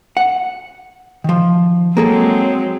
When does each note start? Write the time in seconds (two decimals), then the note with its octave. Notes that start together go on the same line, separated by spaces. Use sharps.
0.17 F#5
1.24 D#3 F3
1.97 F#3 G#3 A#3 C4 G#4 A4